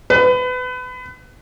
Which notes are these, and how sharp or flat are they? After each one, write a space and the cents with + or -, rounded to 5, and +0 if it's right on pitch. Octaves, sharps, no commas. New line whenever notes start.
B4 +30